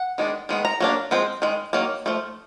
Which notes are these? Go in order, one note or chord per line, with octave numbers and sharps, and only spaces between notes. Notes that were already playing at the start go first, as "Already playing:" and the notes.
Already playing: F#5
D#3 G#3 B3 D4
D#3 G#3 B3
A#5
F#3 A#3 D4
F3 G#3 C4
D#3 G#3
D#3 F#3 A#3
F3 A3